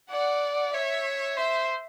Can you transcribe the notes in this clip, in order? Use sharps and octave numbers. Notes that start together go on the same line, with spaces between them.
D5 F#5
C#5 E5
C5 E5